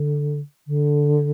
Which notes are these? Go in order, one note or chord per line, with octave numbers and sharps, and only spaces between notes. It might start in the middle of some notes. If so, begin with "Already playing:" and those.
Already playing: D3
D3